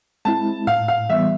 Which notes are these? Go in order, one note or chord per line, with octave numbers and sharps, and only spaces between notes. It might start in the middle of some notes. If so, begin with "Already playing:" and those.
G#3 C4 E4 A5
A2 F5
F5
E3 G3 B3 E5